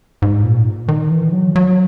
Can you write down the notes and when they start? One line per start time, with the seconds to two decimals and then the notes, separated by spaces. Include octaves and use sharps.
0.22 G#2
0.43 A#2
0.88 D#3
1.11 E3
1.33 F#3
1.56 F#3